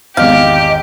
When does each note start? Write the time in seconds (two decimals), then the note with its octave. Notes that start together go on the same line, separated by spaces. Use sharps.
0.17 G#1 E2 G4 D#5 F5